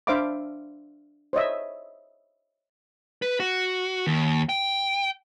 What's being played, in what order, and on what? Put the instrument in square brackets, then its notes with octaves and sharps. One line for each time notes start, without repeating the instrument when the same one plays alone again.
[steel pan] D4 C5 E5 F5 B5 D6
C5 C#5 D#5 E5
[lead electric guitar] B4
F#4
D#2
G5